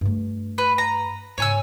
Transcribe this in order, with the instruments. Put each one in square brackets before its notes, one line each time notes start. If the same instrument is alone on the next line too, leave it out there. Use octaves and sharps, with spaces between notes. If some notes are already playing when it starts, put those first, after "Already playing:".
[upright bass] G2 A3
[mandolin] B4
A#5
[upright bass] G#2 C#3 [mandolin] C#5 G#5 E6